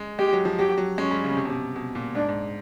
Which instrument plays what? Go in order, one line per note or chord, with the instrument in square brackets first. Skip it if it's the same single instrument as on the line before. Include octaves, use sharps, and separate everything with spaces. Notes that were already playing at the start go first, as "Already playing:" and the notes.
Already playing: [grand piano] G#3
[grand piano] G#3 [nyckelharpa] G4
[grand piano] F#3
F3
[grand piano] F#3 [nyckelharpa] G4
[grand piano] F#3
[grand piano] G#3 [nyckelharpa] C#4
[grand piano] G3
C#3
C3
B2
C3
B2
A#2
[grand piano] G#2 [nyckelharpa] D4
[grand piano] G#2